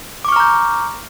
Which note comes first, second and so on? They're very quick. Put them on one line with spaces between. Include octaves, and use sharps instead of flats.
D6 C#6 F6 A#5 G6